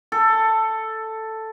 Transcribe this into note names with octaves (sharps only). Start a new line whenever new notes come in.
A4